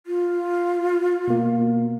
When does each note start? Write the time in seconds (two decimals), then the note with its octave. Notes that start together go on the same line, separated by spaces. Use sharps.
0.06 F4
1.28 B2 A#3